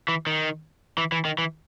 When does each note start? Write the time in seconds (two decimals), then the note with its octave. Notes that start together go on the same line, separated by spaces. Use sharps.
0.08 E3
0.27 D#3
0.98 E3
1.12 E3
1.25 D#3
1.38 E3